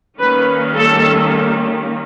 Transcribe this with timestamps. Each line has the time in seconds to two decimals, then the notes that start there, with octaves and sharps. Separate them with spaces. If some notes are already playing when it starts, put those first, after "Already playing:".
0.19 D#3 G3 A#3 C#4 B4
0.74 A4